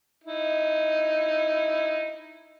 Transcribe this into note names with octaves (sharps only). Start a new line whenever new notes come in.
D#4 E4